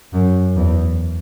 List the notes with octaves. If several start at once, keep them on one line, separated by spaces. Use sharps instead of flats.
F#2
E2